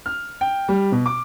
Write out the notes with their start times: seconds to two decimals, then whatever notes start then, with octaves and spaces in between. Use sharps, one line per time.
0.06 F6
0.41 G5
0.69 G3
0.92 B2
1.06 D6